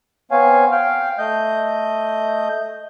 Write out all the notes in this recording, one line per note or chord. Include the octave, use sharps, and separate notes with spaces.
B3 C4 C#5 F5 G#5
F5 G5 F6
A3 D#5 G6